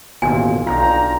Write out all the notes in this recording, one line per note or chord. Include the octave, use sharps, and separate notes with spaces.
A1 D#2 B2 F4 G#5
B1 D4 F4 G5 A#5